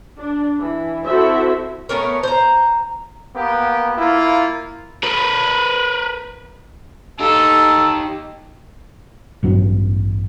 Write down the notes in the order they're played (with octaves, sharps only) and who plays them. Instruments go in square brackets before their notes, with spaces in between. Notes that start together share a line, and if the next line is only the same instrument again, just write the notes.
[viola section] D4
E3
C4 E4 F#4 A4 C5 E5
[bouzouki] A3 B3 C#4 A#4
C5 A#5
[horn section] A#3 B3 G4
A#3 E4 F4
[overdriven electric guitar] A#4 B4
[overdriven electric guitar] D#4 G4 [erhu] A4
[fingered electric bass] A1 G2 F#3 B3